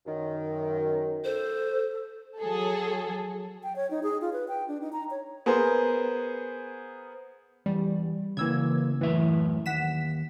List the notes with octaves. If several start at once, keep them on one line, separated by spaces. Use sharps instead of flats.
F#2 D#3
A4 C5
F#3 G#4 A4
G5
C#5
D#4
G#4
F4
B4
G5
D4
D#4
A#5
C#5
B3 G#4 A#4 C5
E2 G3
C#3 E3 A#3 E6 G#6
F#2 A2 E3 E5
D#2 F#5 B6 E7